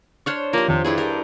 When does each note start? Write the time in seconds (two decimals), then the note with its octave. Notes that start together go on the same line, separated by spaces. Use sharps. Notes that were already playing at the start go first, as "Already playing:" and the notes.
0.26 D4 C5 C#5 C#6 F6 F#6
0.53 F3 A#3 G4
0.68 F2 C3 D#3
0.85 G2 D4 E4 G#4
0.98 G4 A#4